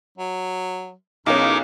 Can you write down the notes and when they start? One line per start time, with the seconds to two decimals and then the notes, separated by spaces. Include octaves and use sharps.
0.18 F#3
1.26 B1 E2 C#4 D#4 A#4 D6